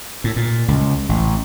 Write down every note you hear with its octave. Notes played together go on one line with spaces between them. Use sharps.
A2
A#2
C#2
A1